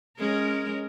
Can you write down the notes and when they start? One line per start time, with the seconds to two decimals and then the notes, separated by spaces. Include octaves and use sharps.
0.18 G#3 C#4 A#4